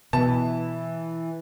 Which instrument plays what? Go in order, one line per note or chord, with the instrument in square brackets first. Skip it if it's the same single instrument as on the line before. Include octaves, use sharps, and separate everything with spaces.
[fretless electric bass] B2 [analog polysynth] E3 [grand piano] A5